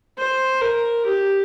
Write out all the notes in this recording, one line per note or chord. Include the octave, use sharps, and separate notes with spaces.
C5
A#4
G4